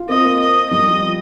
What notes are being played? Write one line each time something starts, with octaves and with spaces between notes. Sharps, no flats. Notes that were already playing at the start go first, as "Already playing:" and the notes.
Already playing: F4
C4 D#5
A#3
D#5
G3 D#5
F3